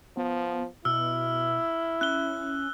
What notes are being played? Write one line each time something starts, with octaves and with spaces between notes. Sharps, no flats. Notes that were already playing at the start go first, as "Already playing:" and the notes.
F3 B3
B2 E4 E6 F6
C#4 F#6 G7